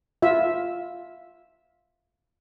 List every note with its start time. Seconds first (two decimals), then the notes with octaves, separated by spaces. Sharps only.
0.22 F4 E5